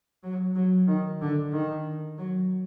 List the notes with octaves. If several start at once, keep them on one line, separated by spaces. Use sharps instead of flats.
F#3
F#3
D#3
D3
D#3
F#3